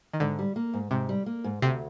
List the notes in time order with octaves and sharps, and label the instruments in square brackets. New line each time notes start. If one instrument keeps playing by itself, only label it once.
[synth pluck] D#3
[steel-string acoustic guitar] G#2 [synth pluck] D3
[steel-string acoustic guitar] G3
A#3
G#2
[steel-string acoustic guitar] G#2 [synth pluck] C3
[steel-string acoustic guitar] G3
A#3
G#2
[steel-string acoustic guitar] D2 [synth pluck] C3